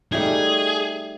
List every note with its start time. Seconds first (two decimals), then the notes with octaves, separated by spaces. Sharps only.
0.12 G3 A3 D#4 G#4